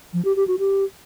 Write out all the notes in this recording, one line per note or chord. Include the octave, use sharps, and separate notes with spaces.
F3
G4
G4
F#4
G4